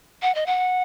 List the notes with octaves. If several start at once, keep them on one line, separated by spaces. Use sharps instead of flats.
F#5
D#5
F#5